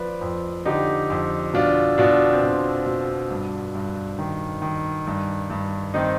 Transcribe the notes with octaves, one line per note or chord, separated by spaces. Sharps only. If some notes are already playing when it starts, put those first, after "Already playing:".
Already playing: F3 B4 D5
F2
D3 D#4 G4
F2
B2 D4 F4
B2 D4 F4
C4
B2 D4
B2
G2
G2
D#3
D#3
G2
G2
D#3 C4 D#4